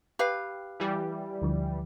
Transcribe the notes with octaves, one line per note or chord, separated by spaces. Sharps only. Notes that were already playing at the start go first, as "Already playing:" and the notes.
G4 B4 F5
E3 G3
D2 D3 F3